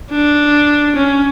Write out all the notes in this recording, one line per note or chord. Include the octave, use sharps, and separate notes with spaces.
D4
C#4